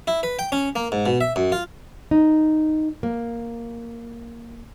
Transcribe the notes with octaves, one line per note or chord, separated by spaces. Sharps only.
E4
B4
G5
C#4
A#3
G#2
B2
E5
F#2
F4
D#4
A#3